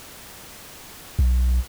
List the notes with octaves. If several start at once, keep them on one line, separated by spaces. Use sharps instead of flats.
B1